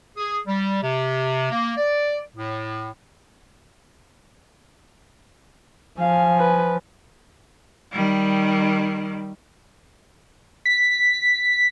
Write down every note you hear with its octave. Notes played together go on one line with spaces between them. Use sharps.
G#4
G3
C3
A#3
D5
A2
F3 F5 G#5
B4
D#3 G3
B6